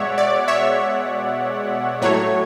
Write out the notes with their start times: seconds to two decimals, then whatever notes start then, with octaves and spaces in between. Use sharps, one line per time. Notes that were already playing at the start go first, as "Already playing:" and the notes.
Already playing: B2 G#3 C#5 D5 E5 F#5
0.18 D5
0.48 C#5 E5
2.02 A2 F#3 A3 C#5